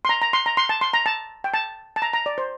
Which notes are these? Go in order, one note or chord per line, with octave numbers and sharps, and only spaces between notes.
C6
A#5
A#5
C6
A#5
C6
A5
C6
A#5
A5
G5
A5
A5
A#5
A#5
D5
C5